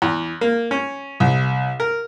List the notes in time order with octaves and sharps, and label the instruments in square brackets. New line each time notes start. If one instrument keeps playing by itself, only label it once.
[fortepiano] E2
A#3
C#4
C2
A#4